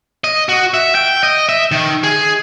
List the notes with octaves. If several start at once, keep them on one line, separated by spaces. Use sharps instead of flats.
D#5
F#4
E5
G5
D#5
E5
D#3
G#4